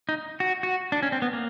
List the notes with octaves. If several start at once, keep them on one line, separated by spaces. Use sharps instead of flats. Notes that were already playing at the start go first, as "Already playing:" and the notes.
D#4
F#4
F#4
D4
C#4
C4
B3
A#3